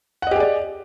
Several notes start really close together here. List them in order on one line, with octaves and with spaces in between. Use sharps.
F#5 D#5 G4 G#4 D5